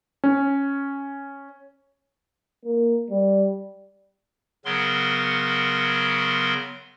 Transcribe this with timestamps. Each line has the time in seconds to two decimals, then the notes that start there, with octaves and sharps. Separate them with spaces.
0.24 C#4
2.65 A#3
3.10 G3
4.65 C#3 F#3 B3 A#4 C6